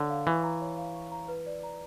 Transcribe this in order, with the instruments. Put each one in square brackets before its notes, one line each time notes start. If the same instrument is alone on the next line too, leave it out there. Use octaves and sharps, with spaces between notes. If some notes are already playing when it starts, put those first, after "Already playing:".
Already playing: [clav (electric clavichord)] D3 [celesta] C#5
[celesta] F5
[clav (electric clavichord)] E3 [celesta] C#6
[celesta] A#5
C#5
F5
C#6
A#5
B4
D5
A#5